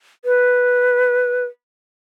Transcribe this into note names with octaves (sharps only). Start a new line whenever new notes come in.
B4